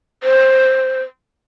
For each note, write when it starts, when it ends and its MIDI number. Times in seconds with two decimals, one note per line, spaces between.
0.23 1.02 72